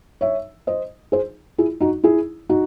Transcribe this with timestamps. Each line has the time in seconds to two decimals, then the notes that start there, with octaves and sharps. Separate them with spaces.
0.21 C#5 E5
0.67 C5 D#5
1.12 G#4 C5
1.58 E4 G#4
1.81 D#4 F#4
2.04 E4 G#4
2.49 D#4 F#4